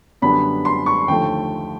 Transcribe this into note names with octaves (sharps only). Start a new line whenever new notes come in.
F#2 D3 G3 B3 D4 B5
C6
C#6
D#2 D3 F3 A3 G5